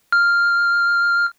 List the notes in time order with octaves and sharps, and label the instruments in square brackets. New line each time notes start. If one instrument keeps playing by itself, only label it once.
[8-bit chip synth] F6